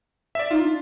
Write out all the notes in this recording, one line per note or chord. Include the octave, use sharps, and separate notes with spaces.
D5 E5
D#4 F4
D4